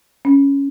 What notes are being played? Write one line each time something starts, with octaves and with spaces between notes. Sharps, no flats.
C#4